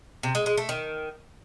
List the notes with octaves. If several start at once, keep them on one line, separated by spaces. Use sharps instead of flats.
C3
G#3
G#3
A3
D#3